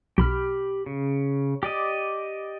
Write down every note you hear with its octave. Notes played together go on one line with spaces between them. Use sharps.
B1 G4 B5 F6
C#3
G4 D5 D#5